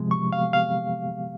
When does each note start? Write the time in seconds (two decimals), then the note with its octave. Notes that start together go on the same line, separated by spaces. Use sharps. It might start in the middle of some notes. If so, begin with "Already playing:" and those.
Already playing: C3 F3 G#3
0.11 C#6
0.33 F5
0.53 F5